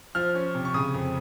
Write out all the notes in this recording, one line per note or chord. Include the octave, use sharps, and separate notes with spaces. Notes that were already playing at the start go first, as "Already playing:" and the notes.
F3 F6
C#4
C3
C#6
C#3 D#6
F2